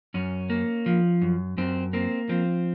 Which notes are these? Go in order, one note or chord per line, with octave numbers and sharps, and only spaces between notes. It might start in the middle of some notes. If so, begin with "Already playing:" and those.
F#2 C#4
A#3
F3
F#2
F#2 C4
A#3 C4
F3 C4